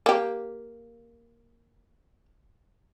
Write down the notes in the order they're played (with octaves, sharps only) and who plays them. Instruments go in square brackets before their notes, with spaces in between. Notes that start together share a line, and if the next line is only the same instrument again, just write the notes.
[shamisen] A#3 G4